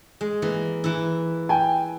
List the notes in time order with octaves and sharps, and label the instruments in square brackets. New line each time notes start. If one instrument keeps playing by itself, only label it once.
[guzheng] G#3
E3 A#3
E3 E4
[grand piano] G5 G#5